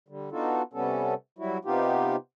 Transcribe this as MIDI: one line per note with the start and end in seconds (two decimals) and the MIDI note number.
0.08 0.29 50
0.08 0.29 55
0.31 0.62 59
0.31 0.62 62
0.31 0.62 63
0.31 0.62 65
0.31 0.62 66
0.31 0.62 69
0.73 1.14 48
0.73 1.14 55
0.73 1.14 59
0.73 1.14 61
0.73 1.14 69
1.39 1.58 54
1.39 1.58 55
1.39 1.58 64
1.39 1.58 66
1.65 2.16 48
1.65 2.16 59
1.65 2.16 63
1.65 2.16 65
1.65 2.16 67